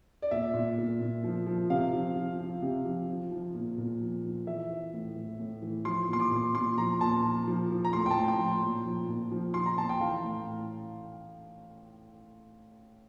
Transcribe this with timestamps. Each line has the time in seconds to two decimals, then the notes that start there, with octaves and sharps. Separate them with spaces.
0.22 D5
0.31 A#2 E5
0.54 A#2
0.78 A#2
1.00 A#2
1.24 F3
1.47 F3
1.70 C3 F5
1.93 F3
2.16 F3
2.39 F3
2.62 C3
2.85 F3
3.08 F3
3.31 F3
3.54 A#2
3.78 A#2
4.01 F3
4.24 F3
4.47 E3 E5
4.70 E3
4.93 A2
5.16 E3
5.39 A2
5.62 E3
5.85 F3 C6
6.09 A#2 C6
6.20 D6
6.31 A#2
6.55 A#2 C6
6.78 F3 A#5
7.00 A#2 A5
7.24 F3
7.48 F3
7.70 F3
7.85 A#5
7.93 A2 C6
8.06 G5
8.11 A5
8.16 A2
8.28 G5
8.39 F3
8.63 A#2
8.85 F3
9.08 A#2
9.32 F3
9.54 F3 C6
9.66 A#5
9.78 A#2 A5
9.89 G5
10.01 E3 F5
10.24 A2